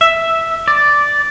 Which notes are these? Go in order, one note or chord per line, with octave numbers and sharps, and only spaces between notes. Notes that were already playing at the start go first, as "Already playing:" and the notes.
E5
D5